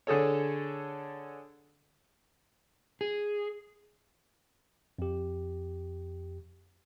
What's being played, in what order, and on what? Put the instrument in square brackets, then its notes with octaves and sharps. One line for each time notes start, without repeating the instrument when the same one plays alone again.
[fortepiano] D3 G#4 A4 C#5
[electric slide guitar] G#4
[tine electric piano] F2 G4